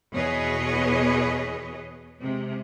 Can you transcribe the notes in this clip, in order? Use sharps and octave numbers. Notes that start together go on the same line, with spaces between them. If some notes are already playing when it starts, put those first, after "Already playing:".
E2 B2 G#4 B4 C#5 D#5
C3 G#3